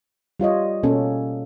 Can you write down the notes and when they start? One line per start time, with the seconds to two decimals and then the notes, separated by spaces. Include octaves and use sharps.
0.40 G3 F4 C#5 D#5
0.83 B2 A#3 C#4 A4